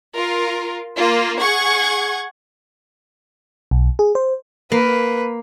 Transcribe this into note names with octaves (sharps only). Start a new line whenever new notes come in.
F4 A#4
A#3 F4
G#4 F#5 C#6 G#6
B1
G#4
C5
A#3 B4